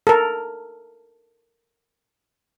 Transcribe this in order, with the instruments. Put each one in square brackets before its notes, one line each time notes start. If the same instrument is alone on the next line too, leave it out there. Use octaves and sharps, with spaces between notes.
[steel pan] A4 A#4